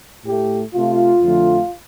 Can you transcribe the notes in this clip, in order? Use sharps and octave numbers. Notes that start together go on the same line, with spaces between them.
A2 A3 G4
C3 A3 F4
F2 D3 F3 A3